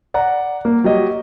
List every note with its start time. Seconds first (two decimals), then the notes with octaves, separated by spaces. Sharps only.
0.14 D5 F#5 A#5
0.65 A#3
0.84 F#3 G4 D#5